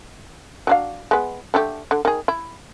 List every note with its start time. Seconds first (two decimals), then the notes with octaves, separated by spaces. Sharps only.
0.67 F#3 D4 F5
1.11 G#3 B3
1.54 D3 A3 G4
1.91 D3
2.05 D#3 G#4
2.28 E4